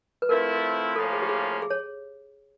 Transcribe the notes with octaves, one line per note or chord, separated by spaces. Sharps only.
B4
F3 A3 C4 E4 A#4
A2 F3 A#3 C#4 A4
G#4
G4
G#4
G#4
C#5